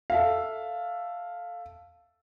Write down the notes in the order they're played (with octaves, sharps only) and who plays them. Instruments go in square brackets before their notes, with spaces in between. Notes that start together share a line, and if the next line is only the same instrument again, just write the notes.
[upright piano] A4 E5 F5